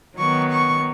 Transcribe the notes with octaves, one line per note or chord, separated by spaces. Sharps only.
D#3 F#3 B3 C#6
C#6